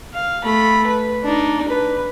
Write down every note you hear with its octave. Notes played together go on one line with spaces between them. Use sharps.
F5
A3 B5
B4
D4 D#4
B4